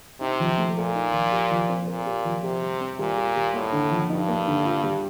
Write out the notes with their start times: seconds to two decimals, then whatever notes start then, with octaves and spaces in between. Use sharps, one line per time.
0.21 C3 D#4
0.40 F3
0.58 A3
0.77 A#2 A4
0.95 D#4
1.13 F3
1.32 G4
1.51 F3
1.69 C4
1.87 A#2 A#4
2.06 G4
2.25 F3
2.43 C3 G4
2.62 G3
2.81 C4
2.99 A#2 G3
3.17 G4
3.36 G3
3.54 A2 A#3
3.72 D3
3.91 F3
4.10 G2 D#4
4.28 A#3
4.48 D3
4.65 F4
4.84 G3